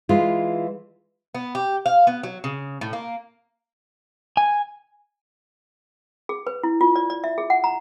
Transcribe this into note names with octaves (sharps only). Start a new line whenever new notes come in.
E3 G#3 F4
B3
G4
F5
B3
F#3
C#3
A2
A#3
G#5
G#4
B4
E4
F4
D5
D5
E5
G#4
F#5
A#5